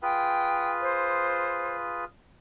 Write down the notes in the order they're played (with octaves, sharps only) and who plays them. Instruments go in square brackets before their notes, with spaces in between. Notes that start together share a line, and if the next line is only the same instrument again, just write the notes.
[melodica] F4 G#4 B4 [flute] G5
[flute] C5